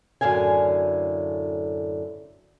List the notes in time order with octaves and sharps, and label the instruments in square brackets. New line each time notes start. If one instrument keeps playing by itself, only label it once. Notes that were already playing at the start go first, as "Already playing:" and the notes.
[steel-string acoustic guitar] F#2 A2 D3 F5 G#5